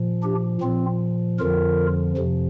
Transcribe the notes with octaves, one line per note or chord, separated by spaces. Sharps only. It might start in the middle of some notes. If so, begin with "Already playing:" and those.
Already playing: A#2 F3
D4 G4
A#2 F3 C4 F4
F2 D3 F3 F4 A#4
F2 C3 F3